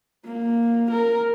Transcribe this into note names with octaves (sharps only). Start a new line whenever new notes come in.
A#3
A#4